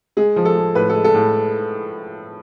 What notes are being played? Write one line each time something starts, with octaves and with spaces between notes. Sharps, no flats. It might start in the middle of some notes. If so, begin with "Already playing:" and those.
G#3 G#4
F3
A4
G#3
A2 B4
A4
G#3
A4
A2